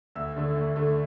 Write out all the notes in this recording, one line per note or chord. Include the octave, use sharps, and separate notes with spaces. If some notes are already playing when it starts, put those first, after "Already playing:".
D2 E6
D3 A3
D2
D3 A3